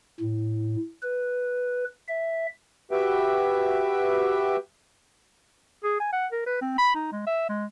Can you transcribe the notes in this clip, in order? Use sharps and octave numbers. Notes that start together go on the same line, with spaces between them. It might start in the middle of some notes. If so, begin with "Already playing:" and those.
A2
B4
E5
F#4 G4 B4 E5 G5
G#4
G#5
F#5
A#4
B4
C4
B5
D#4
G#3
E5
G#3